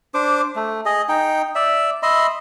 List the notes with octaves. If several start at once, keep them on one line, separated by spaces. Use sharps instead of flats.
D4 C5 D6
A3
G#4 D#5
D#4 G5
D5 E5
D#5 E5 B5 C6